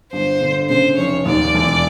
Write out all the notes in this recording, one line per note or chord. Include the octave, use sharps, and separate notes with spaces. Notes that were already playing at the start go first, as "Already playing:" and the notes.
G1 C5
D3
C#3 C5
F1 C#5
D#2 D5
E1